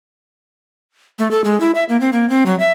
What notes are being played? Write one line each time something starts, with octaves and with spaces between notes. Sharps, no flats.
A3
A4
G#3
E4
E5
A#3
C4
A#3
C4
F#3
E5